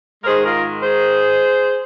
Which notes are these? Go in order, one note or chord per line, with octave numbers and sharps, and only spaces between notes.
A#4
G#2 D#3 G#3 G#4 C5
F4 A#4
G#4 C5